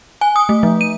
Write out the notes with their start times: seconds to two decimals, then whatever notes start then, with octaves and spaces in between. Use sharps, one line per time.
0.21 G#5
0.36 D#6
0.49 A3
0.63 F3
0.81 D#7